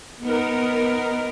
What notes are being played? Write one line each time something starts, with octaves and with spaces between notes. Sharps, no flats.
B3 D#4 A#4